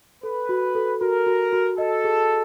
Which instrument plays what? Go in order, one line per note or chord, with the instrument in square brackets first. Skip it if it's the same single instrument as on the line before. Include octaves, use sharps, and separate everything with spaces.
[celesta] A4 [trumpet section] B4
[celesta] F#4
A4
[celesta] F#4 [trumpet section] A#4
[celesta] F#4
F#4
[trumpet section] A4 [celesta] D#5
[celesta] G#4